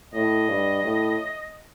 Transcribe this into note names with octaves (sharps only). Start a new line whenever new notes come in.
A2 D#5
G2
A2